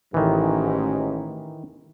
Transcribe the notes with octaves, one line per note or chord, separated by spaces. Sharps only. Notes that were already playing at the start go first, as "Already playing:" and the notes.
A1 G#2 D#3 E3